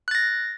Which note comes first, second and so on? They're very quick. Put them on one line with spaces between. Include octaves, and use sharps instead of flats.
F#6 A6 A#6